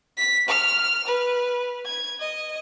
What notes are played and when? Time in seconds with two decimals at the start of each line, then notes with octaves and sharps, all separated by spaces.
0.17 B6
0.48 F6
1.07 B4
1.86 G#6
2.20 D#5